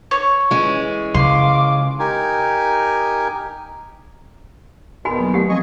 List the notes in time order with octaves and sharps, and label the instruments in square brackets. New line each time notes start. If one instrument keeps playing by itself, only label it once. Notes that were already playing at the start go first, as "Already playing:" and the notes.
[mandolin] C#5
[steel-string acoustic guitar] E3 G#3 C#4
[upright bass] C#3 [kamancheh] F5 D6 [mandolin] C6
[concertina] D#4 G4 A#4 G#5
[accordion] E2 B2 D#3 [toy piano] F#4 G#5 B5
[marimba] F#3 A#3
[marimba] A3 [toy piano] G4 F#5
[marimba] F3 C4 F5 [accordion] D#5 G#5 C#6